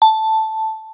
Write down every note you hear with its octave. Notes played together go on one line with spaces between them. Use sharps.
A5